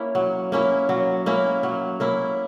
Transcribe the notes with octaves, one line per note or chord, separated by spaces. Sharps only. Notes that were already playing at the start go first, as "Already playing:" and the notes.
Already playing: A#3 C#4 E4
F#3
A#3 C#4 E4
F#3
A#3 C#4 E4
F#3
A#3 C#4 E4